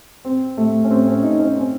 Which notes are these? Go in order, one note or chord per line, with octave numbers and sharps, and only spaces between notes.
C4
A3
C#4
C4
C#4
D#4
C#4
C4